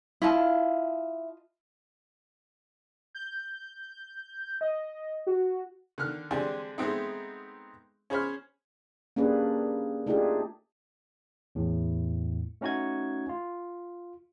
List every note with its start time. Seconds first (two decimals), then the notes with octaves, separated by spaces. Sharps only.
0.22 E4 F4 D#5 F5 A5
3.15 G6
4.61 D#5
5.27 F#4
5.98 D3 D#3 F6 F#6
6.31 D3 G#3 C4 D4 G4 G#5
6.78 G#3 A3 B3 C4 D#4
8.10 C#4 G#4 C5 C#5 B5 F6
9.16 A#3 C#4 D4 G4 G#4 B4
10.07 A3 D4 D#4 F4 G4 G#4
11.55 E2 A2
12.61 A3 C#4 D#4 F#4 G#5 G#6
13.29 F4